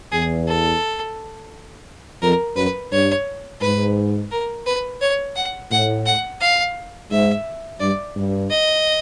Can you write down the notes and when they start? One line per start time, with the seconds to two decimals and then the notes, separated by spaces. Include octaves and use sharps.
0.12 E2 G#4
0.47 A4
2.22 F2 A#4
2.57 F#2 B4
2.92 G2 C#5
3.61 G#2 B4
4.31 A#4
4.67 B4
5.01 C#5
5.36 F#5
5.71 A2 F#5
6.06 F#5
6.41 F5
7.11 G#2 E5
7.80 G2 D5
8.16 G2
8.50 D#5